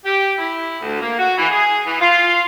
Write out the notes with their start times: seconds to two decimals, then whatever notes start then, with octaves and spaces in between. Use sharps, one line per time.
0.04 G4
0.38 E4
0.82 D2
1.00 A#3
1.17 F#4
1.37 E3
1.50 G#4
1.85 E3
1.99 F4